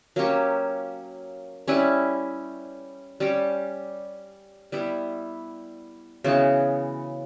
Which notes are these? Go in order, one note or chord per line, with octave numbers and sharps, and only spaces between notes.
F#3 A#3 C#4 G4
G3 C#4 E4 B4
G3 C#4 G4
G3 B3 E4
C#3 E3 B3 F#4